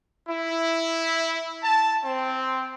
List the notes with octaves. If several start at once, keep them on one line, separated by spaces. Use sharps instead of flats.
E4
A5
C4